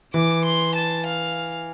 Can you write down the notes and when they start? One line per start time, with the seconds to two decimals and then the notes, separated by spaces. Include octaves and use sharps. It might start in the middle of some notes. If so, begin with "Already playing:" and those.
0.14 E3 D6
0.45 C6
0.75 A5
1.06 F5